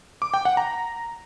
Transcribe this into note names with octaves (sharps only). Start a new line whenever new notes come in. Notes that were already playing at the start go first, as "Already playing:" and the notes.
D6
G5
F#5
A#5